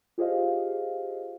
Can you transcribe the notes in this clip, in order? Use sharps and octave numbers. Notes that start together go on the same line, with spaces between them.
F4 G4 G#4 C5 D#5 F5